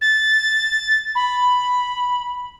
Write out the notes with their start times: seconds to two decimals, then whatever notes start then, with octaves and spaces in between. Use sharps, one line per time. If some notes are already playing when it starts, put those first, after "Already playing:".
0.01 A6
1.15 B5